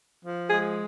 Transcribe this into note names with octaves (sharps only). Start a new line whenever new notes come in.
F3
G#3 G#4